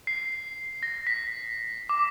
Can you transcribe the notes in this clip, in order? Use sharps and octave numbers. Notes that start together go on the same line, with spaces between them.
C7
A#6
B6
D6